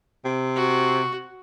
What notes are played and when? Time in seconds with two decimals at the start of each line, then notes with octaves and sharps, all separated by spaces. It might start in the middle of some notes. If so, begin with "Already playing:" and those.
0.25 C3
0.56 F#4